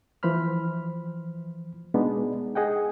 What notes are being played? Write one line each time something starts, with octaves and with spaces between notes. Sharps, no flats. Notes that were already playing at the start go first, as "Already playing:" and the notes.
E3 F3 C5 B5 F6
B2 G#3 B3 D4 D#4
G#4 D#5 F#5 G5